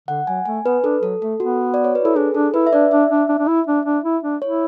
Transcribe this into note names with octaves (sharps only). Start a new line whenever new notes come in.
D3 F#5
F#3 G#5
A3 G#5
B3 B4
D4 A4
F#3 A4
A3 A4
B3 F#4
D5
C#5
B4
E4 A4
D4 G#4
D4 A4
E4 B4
E5
D4 D5
D4 E5
D4
D4
D4
E4
D4
D4
E4
D4
E4 C#5